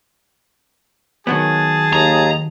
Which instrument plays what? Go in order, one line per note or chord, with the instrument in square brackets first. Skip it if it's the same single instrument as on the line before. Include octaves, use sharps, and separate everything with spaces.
[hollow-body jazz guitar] D#3 F#3 B3 [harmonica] G#4 A5
[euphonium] D#2 [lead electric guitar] A#5